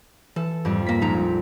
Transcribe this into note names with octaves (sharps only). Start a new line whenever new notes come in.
E3 A4
F2 G#2 G3
B1 A#3 B6
A#1 G#3 D#4 A#5